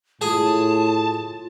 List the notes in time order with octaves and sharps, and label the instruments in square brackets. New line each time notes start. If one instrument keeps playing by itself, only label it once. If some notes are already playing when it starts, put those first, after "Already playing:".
[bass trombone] A2 [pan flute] F4 [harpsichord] G#4 [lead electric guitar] A5